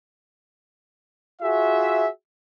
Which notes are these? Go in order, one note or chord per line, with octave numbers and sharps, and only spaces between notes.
F4 F#4 G#4 E5